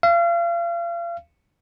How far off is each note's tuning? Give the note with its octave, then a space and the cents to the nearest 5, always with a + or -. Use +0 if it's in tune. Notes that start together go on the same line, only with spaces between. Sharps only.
F5 -35